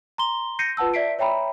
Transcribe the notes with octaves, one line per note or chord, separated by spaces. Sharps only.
A#5 C6 G7
G6 A#6 C7 C#7 D#7
F4 B4 F#5 A5 E6
D5 E5 B6 C7 D7
C#5 E5 G5 A#5 B5